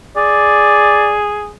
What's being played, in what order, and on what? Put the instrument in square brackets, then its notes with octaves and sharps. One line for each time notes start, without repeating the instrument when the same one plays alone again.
[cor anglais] G#4 [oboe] D5